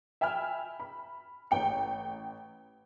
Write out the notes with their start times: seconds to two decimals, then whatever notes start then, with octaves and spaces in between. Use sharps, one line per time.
0.21 E5 G5 G#5 B5 F6
0.80 B5
1.51 A1 G5 C#7